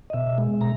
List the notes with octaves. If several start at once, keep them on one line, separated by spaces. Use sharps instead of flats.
D#5
B2 E5
G#3
B2 A#5